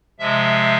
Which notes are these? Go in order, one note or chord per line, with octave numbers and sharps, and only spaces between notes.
C3 F3 G#3 E5